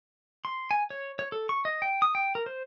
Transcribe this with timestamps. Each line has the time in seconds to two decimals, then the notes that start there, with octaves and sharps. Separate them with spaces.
0.45 C6
0.71 G#5
0.90 C#5
1.19 C#5
1.32 A4
1.49 C#6
1.65 D#5
1.82 G5
2.02 D#6
2.15 G5
2.35 A#4
2.46 C5